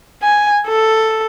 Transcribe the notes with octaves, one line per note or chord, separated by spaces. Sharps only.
G#5
A4